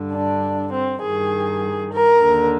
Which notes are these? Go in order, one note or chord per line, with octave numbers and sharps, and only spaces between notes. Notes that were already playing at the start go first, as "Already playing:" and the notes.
Already playing: G2 D3
D4
C4
G2 D#3 G#4
A#4
D#2 D3